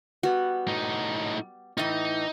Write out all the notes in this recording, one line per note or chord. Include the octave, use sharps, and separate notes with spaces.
G3 B3 F#4
A2 D#4
A2 E3 D#4